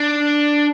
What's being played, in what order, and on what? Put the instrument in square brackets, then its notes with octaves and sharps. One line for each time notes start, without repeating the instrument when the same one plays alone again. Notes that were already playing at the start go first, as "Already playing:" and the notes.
Already playing: [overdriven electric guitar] D4